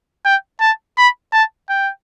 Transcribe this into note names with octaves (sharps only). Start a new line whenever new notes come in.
G5
A5
B5
A5
G5